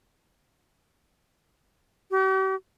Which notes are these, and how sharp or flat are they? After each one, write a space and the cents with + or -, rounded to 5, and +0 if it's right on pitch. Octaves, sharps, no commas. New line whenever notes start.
G4 -45